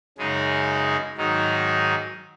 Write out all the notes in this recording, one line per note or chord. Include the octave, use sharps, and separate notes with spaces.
F#2 C#3 G#3 D#4 G#4
G#2 D#3 F#3 D#4 G#4